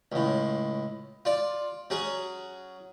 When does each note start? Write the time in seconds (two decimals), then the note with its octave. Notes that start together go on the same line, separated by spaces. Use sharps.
0.12 C#2 A2
1.25 F4 D5
1.90 F#3 C#4 G#4